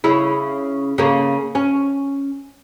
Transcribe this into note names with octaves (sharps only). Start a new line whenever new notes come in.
C#3 E4
C#3 A#3
C#4